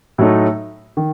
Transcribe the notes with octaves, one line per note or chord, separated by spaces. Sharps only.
A2 F#3 A3 D#4
D#3